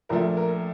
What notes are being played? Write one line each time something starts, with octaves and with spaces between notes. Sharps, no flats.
A#1 A#2 F3 A3 A#4
A#4